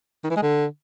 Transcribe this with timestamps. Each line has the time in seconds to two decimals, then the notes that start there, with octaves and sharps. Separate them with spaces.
0.24 D#3
0.30 E3
0.36 G#3
0.42 D3